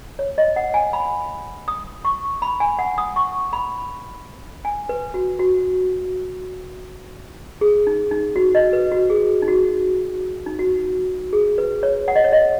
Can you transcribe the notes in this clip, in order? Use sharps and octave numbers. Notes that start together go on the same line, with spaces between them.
C#5
D#5
F#5
G#5
B5
D#6
C#6
B5
G#5
F#5
D#6
C#6
B5
G#5
B4
F#4
F#4
G#4
D#4
D#4
F#4
D#5
B4
F#4
G#4
D#4
F#4
D#4
F#4
G#4
B4
C#5
F#5
D#5
C#5
D#5